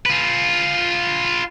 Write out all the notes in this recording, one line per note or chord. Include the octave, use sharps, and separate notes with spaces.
F4 B4